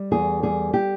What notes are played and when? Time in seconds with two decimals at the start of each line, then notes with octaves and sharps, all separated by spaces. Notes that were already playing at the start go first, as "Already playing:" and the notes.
Already playing: G3
0.11 E2 G#4
0.43 G3 G#4
0.73 G4